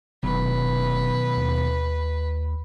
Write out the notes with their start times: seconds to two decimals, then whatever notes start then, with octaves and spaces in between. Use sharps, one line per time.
0.23 F1 B2 D#3 F#3 B4
1.36 D#2